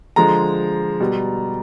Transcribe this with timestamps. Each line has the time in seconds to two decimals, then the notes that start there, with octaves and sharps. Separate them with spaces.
0.16 D3 F3 G#3 A#5
1.00 B2 G3